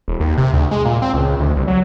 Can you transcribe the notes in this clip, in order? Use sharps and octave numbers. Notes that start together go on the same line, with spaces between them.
E1
D#2
C3
D2
G#3
A#2
C4
C#2
D2
C2
F#3